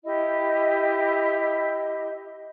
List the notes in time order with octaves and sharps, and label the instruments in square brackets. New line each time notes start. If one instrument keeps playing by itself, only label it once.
[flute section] E4 G4 D#5